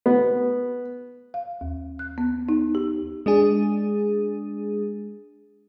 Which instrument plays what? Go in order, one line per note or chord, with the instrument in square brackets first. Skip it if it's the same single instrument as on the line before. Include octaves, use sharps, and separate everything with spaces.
[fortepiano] B3
[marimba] F5
D#2
F#6
B3
D#4
G4
[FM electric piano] G#3 D4 G#4